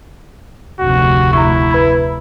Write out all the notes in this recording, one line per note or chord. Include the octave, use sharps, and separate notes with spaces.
F1 D2 F#4
E4 A#5 C#6
B4 B5 G#6